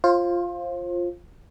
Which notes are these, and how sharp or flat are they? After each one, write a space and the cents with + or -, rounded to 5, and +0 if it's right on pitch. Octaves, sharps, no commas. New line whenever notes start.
F4 +0 C5 +30